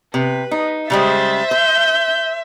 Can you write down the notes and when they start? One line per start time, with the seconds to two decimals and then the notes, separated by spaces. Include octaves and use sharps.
0.14 C3 B4
0.51 D#4
0.90 C#3 G3 G#3 C5 E5 A6
1.51 C5 G6